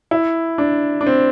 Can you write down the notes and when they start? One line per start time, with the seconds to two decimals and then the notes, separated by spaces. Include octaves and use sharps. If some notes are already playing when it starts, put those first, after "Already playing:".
0.11 E4
0.58 D4
1.01 D4
1.07 C4